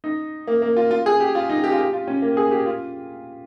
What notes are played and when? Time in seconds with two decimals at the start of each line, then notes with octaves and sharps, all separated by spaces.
0.04 D#4
0.47 A#3
0.62 A#3
0.77 F4
0.91 F4
1.06 G#4
1.20 G4
1.35 F4
1.49 D#4
1.64 G4
1.72 F4
1.79 G4
1.93 F4
2.07 C#4
2.22 A#3
2.37 G#4
2.51 G4
2.66 F4